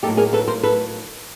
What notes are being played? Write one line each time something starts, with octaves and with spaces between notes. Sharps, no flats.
A2 F#3 A#3 D#4 G4 A4
G#4 A#4
A4 B4
A#4 C5
A4 B4